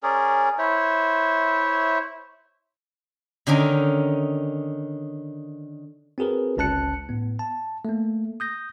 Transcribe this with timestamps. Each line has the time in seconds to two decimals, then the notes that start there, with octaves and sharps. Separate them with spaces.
0.03 C#4 G#4 A#4 D5
0.58 E4 C5 C#5 E5
3.47 D3 D#3 C#4 D#4 A#4
6.18 C4 F#4 G#4 A#4 B4
6.57 G1 C#2 C#4 A5 F#6 C#7
7.09 A2 B3
7.39 A5
7.85 A3 A#3
8.40 D#6 G6 A#6